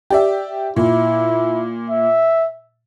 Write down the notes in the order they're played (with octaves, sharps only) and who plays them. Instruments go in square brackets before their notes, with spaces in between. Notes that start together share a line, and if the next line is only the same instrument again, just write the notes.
[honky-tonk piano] G4 D5 E5
[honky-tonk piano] A#2 [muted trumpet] E4
[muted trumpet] E5